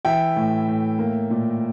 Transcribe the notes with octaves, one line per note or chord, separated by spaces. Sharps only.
E3 E5 G5
A2
A2
A#3
A#2